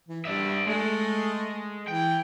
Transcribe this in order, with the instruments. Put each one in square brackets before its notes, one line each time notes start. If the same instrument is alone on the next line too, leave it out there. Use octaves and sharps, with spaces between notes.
[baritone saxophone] E3
[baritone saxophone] G2 [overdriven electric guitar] D5 E5
[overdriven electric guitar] G#3 [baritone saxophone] A3
[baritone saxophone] E3 [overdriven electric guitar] G5